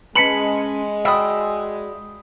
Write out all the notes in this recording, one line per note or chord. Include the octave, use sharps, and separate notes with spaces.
G#3 C#4 B4 A5 B6 C#7 F#7
F#4 D5 E5 G5 B5 D#6